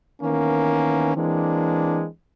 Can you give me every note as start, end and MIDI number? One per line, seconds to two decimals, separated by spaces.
0.22 1.12 51
0.22 1.12 52
0.22 1.12 58
0.22 1.12 59
0.22 1.12 61
1.16 2.06 52
1.16 2.06 56
1.16 2.06 58
1.16 2.06 60
1.16 2.06 62